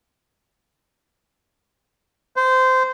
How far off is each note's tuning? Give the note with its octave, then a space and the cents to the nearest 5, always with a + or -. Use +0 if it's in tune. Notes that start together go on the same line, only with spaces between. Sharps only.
C5 -20